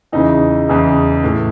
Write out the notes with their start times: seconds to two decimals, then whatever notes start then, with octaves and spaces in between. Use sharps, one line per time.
0.12 E2 C#3 E3 D#4
0.68 E2 C#3 E3
1.23 A2 E3